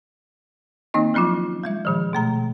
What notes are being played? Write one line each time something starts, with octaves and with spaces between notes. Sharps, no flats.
D#3 A#3 C4 D#4 D#5
F3 F#3 C#4 E4 F4
G3 G#3 E5
A#2 D#3 F3
B2 A3 A#5